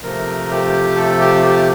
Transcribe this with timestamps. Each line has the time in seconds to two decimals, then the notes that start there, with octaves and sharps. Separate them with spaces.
0.03 C3 F3 A3 A#4
0.51 G4
0.96 A4
1.20 G4
1.43 G4